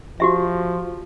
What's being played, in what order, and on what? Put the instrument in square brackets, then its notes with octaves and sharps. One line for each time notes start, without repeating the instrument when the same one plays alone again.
[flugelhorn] F3 [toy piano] F#4 G4 E5